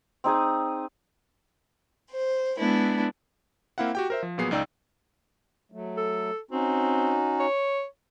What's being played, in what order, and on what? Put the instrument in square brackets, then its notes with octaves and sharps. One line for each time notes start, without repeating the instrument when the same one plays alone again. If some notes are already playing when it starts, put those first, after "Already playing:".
[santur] C4 D#4 G#4 D#6
[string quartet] C5
G#3 B3 D4 E4
[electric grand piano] A#3 C4 E4 F5 F#5
F#4 G4 G5
A#4 C5 E5
F3
A#2 F#3 B3 G#4 C7
C#2 D#4 D5 G5 E6
[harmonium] F#3 A3
[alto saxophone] A4
[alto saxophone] C4 [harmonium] C#4 D#4 F#4
[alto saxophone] C#5